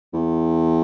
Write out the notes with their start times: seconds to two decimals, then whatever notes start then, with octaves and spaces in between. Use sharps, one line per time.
0.14 E2